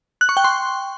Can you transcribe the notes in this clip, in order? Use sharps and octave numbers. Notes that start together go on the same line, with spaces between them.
F#6
C#6
G5
C6